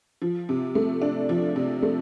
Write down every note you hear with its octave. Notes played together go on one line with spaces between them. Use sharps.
F3
C3
A3
D4
F3
C3
A3